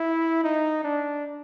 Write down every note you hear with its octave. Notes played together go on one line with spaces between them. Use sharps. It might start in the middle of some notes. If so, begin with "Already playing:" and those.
Already playing: E4
D#4
D4